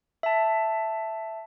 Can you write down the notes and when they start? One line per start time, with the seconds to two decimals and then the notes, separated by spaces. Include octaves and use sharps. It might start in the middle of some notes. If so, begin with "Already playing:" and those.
0.23 E5 A5